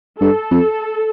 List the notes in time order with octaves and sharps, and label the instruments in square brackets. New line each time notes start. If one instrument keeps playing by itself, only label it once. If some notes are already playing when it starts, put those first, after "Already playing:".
[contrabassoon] G2 [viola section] A4
[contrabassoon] F2